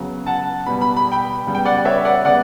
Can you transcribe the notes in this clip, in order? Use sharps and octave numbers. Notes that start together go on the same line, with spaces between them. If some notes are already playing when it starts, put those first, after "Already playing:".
Already playing: C#3 F#3 B3
F#5 A5
B2 G3 B3 B5
B5
B5
G5 B5
C#3 G3 B3
G5
D5 F#5
C#5 E5
D5 F#5
C#3 G3 B3 D5 F#5